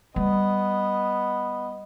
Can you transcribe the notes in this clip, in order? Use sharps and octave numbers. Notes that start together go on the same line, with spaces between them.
G3 B3 D#5